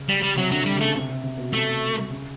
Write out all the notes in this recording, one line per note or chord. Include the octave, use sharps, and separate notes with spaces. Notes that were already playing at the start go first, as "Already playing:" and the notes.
Already playing: C#3
G3
G3
C3 F#3
D3 F#3
G3
C#3 A3
C3
C3
C3
B2
C3 A3
C#3